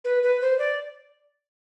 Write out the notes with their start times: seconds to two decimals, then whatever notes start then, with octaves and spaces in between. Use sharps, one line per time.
0.05 B4
0.23 B4
0.41 C5
0.59 D5